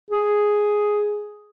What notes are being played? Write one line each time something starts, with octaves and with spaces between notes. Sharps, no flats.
G#4